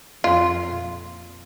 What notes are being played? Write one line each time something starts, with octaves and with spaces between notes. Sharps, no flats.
F2 F4
A#2